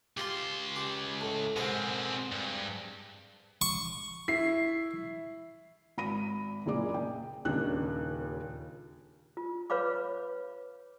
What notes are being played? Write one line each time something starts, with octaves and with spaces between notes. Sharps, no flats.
C#2 F4 G4 C6
G4
A2
G#2 B2 G#3 C4 A#4
G2
C#6
E4 C7
G#1 B5 A#6 D#7
F#1 A#2 G#4 D5 D6
G5
D#1 D#2 C#3 D4 D#4 F#6
F4
B4 C#5 F5 B5 D6